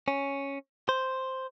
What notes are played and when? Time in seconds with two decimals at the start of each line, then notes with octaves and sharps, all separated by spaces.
0.08 C#4
0.89 C5